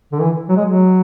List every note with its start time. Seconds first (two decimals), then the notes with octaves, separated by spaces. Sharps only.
0.12 D3
0.20 E3
0.49 F#3
0.56 G#3
0.65 F#3